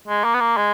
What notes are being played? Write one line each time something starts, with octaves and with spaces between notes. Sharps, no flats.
G#3
A#3
B3
A#3
G#3